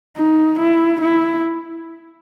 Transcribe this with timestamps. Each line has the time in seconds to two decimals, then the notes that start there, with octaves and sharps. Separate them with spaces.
0.17 D#4
0.59 E4
1.01 E4